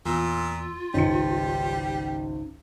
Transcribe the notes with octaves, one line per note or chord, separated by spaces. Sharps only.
E2 A#2 F4 E6
G#1 C#2 G3 C#4 D#4 C#7